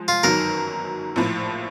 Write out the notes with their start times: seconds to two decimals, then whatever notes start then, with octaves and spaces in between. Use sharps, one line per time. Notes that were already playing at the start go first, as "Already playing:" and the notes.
Already playing: F3 G#3
0.08 F4
0.23 G1 F#2 D#3 F#3 A#4
1.16 A#1 A2 F3